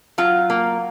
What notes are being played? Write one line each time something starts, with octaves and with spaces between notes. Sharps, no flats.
F#3 F4
A#3